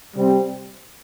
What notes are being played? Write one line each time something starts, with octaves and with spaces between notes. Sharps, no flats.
C3 G3 C4